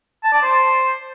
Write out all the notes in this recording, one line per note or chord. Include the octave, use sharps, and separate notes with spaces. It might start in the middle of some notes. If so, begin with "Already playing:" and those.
A5
D5
C5